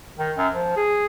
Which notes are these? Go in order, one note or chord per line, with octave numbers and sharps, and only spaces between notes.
D#3
F#2
F3
G#4